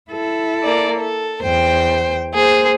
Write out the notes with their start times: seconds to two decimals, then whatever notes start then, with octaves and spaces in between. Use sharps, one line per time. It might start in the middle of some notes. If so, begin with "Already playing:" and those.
0.11 E4 A4
0.63 A#3 D5
1.00 A4
1.43 E2 C5 G5
2.34 A#3 G#4 C5